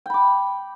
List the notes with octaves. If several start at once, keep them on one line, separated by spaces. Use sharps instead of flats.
G5 B5 D6